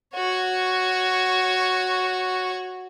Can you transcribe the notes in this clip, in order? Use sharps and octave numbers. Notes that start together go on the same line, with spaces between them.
F#4 C#5